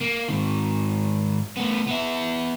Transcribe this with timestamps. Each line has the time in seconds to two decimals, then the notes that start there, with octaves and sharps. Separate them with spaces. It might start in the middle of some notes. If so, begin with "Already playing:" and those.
0.01 A#3
0.28 G#2 D#3
1.57 A3 B3
1.87 B3 E5